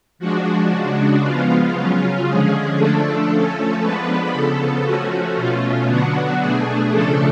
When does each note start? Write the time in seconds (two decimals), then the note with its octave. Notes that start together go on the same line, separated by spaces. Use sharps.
0.19 F3 G#3 D4 F#4
0.70 C#3 G#3 D4 F#4
1.22 F3 G#3 B3 F4
1.74 C#3 F#3 C#4
2.25 D3 F3 G#3 C#4 G#4
2.77 D3 F3 A3 D4 A4
3.30 F3 A3 C#4
3.80 F3 G#3 B3 D4 B4
4.32 C#3 F3 B3 A4
4.83 F3 A3 C#4 F#4
5.36 B2 A3 C#4 F4
5.87 D3 F#3 B3 D4 F#4
6.39 B2 A3 D4 G#4
6.90 C#3 F3 A3 D4 A4